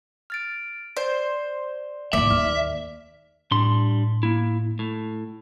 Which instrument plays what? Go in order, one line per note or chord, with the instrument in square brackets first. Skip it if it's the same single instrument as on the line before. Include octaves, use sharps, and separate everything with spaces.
[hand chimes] F6 A6 D7
[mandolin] C5 [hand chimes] D5
[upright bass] A1 D#2 [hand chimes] A#3 [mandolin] D5 [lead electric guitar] E5
[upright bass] D#2 [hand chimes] F6
[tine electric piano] A2 [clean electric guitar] G3 D4 C6
[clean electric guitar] A#3 E4
A2